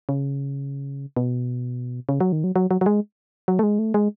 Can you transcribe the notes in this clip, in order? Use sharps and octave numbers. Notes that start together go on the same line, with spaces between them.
C#3
B2
C#3
F#3
D#3
F#3
F#3
F#3
F#3
G#3
F#3
A3
G#3
A3
G#3